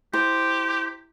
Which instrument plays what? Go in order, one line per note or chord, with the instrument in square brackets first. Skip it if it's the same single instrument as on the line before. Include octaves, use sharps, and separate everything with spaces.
[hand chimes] E4 [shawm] G4 [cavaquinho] C5